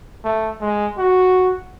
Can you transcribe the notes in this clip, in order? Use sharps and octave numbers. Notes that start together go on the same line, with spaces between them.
A3
G#3
F#4